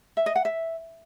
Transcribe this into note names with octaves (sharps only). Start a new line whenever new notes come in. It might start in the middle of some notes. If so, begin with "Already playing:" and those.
E5
D#5
F#5
E5